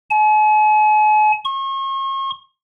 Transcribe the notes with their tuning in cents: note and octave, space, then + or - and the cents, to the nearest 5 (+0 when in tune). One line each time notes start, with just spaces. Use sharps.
G#5 +45
C#6 -40